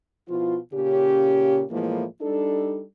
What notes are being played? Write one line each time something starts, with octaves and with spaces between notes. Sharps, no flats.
B2 F3 E4 F4
A#2 C#3 C#4 G4
A2 E3 F3 G#3 A#3
G3 D4 D#4 A4